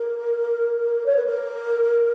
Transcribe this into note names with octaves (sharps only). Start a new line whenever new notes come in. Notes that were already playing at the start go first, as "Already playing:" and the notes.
Already playing: A#4
C#5
B4
A#4